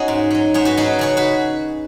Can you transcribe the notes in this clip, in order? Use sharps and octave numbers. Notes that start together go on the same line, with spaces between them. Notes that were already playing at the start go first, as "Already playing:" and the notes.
Already playing: C#4 D#4 F#4 G#4
G#2
F#3 C#4
G#2 G#4 C#5
F#4 B4
F#3 C#4 D#4 G#4
C#3 G#4 C#5
F#4 B4